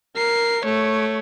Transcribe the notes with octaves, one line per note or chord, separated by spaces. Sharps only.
A#4 C7
A3 C#5